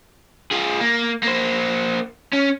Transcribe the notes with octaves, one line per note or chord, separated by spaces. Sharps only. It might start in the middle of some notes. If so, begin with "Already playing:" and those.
F4 G#4
A#3
A#3 C5
C#4